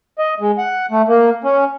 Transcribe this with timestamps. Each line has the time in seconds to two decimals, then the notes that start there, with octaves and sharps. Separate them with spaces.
0.19 D#5
0.40 G#3
0.58 F#5
0.91 A3
1.08 A#3
1.44 C#4